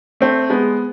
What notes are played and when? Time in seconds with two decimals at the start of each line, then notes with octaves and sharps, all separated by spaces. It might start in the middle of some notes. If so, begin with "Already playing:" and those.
0.21 A3 C4
0.50 G#3 B3